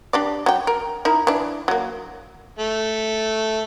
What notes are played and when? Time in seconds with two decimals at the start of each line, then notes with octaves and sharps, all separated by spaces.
0.13 D4 G4 D5
0.46 F#3 G5
0.67 A#4
1.05 D#4 E4 A#4
1.27 E3 D4
1.68 F#3 A#3
2.59 A3